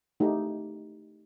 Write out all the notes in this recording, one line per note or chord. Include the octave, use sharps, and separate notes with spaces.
A3 D#4 G4